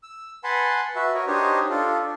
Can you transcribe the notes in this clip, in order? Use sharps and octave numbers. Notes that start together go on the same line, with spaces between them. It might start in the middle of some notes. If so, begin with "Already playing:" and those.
E6
B4 F#5 G#5 A5 B5 C6
F#4 B4 E5
F#4 A#4 C#5 D#5
D4 D#4 G4 C5 C#5 D#5
D4 F4 A4